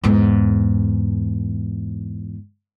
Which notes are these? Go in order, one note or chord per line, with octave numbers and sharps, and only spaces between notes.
E2 G#2